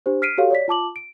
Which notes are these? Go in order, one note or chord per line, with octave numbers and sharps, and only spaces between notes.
D4 G4 C5
F6 B6 C7 D7 D#7
F#4 G4 A4 C#5 F5
C#5 D5 B6
F4 A5 D6 F#7
D7